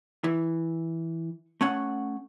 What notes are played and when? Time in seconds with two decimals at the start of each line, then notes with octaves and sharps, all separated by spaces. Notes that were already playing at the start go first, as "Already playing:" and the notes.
0.24 E3
1.61 A3 C#4 F#5